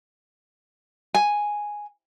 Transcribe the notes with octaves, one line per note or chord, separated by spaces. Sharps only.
G#5